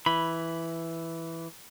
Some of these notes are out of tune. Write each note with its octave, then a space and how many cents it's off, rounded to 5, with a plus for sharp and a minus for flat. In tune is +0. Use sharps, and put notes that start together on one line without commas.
E3 +0 B5 +0